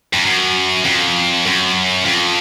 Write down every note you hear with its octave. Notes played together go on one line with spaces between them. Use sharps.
F2
F#2
F2
F#2
F2